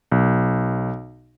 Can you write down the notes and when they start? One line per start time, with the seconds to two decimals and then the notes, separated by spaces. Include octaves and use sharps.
0.12 B1